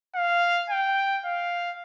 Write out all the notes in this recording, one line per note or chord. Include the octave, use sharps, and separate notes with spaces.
F5
G5
F5